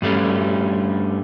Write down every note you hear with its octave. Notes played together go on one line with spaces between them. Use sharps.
G2 G3 A3 C#4